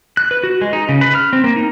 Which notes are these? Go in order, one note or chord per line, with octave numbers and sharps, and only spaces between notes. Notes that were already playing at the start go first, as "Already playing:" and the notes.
F#6
B4
F#4
G#3
D#4
C#3
B4
F6
C4
A#3
D#4